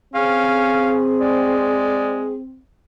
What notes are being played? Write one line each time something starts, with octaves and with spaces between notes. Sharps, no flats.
C4 C#4 G#4 F5
G#3 D5